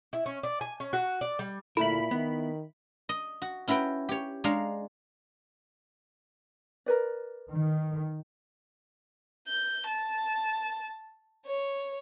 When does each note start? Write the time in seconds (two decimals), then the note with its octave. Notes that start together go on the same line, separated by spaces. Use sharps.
0.13 E4
0.26 C#4
0.43 D5
0.61 G#5
0.80 C#4
0.93 F#4
1.21 D5
1.39 G3
1.77 D2 A#2 A3 E4 A#4 B5
2.11 D#3 B3
3.09 D#5
3.42 F#4
3.68 C#4 E4 F#4 B4 G5
4.09 G4 C#5
4.44 G#3 D4 C#5 F5 A#5
6.86 A#4 B4 D5
7.51 D#3
9.48 G6
9.86 A5
11.46 C#5